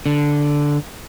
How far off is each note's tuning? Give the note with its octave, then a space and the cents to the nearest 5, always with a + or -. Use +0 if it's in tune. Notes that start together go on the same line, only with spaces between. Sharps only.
D3 -5